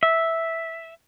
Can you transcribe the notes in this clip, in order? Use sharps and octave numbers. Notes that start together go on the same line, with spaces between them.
E5